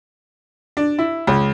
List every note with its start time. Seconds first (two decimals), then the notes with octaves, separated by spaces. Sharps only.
0.77 D4
0.99 E4
1.27 C#2